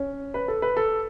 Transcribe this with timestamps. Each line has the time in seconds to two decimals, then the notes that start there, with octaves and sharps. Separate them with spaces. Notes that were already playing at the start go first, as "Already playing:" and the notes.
Already playing: C#4
0.34 B4
0.48 A4
0.62 B4
0.77 A4